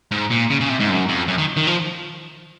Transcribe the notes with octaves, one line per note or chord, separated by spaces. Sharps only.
G#2
A#2
C#3
C#3
C3
G#2
F#2
F2
F#2
D#3
D#3
F3